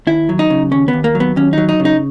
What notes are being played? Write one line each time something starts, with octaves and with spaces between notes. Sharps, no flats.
D#2 E4
F#3
D#4
C#3
D#2 C#4
B3
D#2
A#3
F#3
B3
D#2 C#4
F#3 D#4
D#4
C#3
D#4